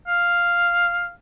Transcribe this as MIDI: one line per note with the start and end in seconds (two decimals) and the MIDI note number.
0.08 1.11 77